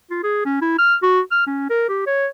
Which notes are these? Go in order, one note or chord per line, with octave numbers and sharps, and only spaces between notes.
F4
G#4
C#4
E4
F6
F#4
F6
C#4
A#4
G4
C#5